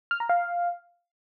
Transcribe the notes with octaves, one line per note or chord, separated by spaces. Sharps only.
F6
A#5
F5